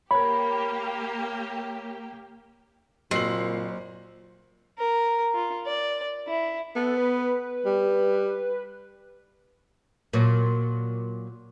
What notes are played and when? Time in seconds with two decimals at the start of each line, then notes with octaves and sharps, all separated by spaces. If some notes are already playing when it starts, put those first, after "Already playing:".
0.11 A#3 G4 A#4 C#5 B5
3.11 F#1 A#2 C4 F#4 C7 F#7
4.78 A#4
5.34 F4
5.66 D5
6.28 E4
6.76 B3 A4
6.97 B4
7.66 G3
10.13 A#2 F#3